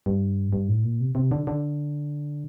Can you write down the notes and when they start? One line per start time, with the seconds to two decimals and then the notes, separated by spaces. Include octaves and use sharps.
0.06 G2
0.53 G2
0.68 A2
0.84 A#2
1.00 C3
1.15 C3
1.31 D3
1.47 D3